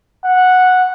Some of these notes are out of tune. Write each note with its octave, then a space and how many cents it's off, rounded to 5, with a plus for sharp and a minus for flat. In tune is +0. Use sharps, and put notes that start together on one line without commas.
F#5 -10